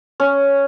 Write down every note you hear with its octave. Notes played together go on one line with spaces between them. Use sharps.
C#4